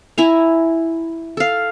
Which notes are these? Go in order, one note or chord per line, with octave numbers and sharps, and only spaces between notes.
E4 G#5 A#5
A4 F5